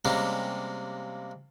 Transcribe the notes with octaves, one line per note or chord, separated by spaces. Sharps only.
C3 G3 G#3 A#3 C#4